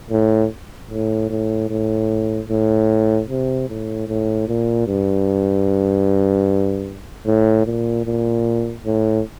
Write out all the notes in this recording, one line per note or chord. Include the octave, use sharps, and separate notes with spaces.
A2
A2
A2
A2
A2
C3
A2
A2
A#2
G2
A2
A#2
A#2
A2